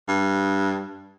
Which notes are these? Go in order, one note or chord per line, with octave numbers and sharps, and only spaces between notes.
G2